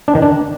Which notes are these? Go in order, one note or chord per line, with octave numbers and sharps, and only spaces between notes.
D4
D#3
D4